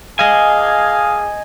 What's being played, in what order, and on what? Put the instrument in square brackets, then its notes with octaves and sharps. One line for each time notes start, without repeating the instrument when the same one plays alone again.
[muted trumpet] G#4 [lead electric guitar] D#5 G#5 [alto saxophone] F5